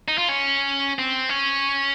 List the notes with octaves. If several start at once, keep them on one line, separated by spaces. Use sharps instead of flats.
D#4
F4
C#4
C4
C#4